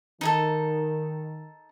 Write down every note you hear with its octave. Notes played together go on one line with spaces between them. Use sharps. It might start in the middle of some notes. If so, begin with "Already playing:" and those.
D#3 D#4 G#4 A4